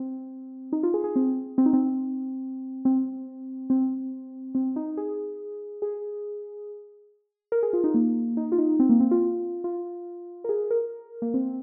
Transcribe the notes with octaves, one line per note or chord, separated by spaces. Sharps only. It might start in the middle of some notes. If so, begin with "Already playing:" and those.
Already playing: C4
D#4
F4
G#4
G#4
C4
C4
D#4
C4
C4
C4
C4
D#4
G#4
G#4
A#4
G#4
F4
D#4
A#3
D#4
F4
D#4
C4
A#3
C4
F4
F4
A#4
G#4
A#4
A#3
C4